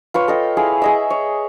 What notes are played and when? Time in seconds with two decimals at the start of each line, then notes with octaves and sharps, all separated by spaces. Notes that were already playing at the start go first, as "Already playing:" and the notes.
0.14 F4 B4 C#5
0.28 A4 D#5 G5
0.57 E4 G#4 F5
0.82 G#4 D#5 E5
1.10 C#5